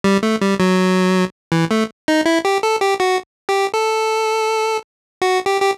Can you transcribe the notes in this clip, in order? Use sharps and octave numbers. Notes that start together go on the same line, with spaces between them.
G3
A3
G3
F#3
E3
A3
D#4
E4
G4
A4
G4
F#4
G4
A4
F#4
G4
G4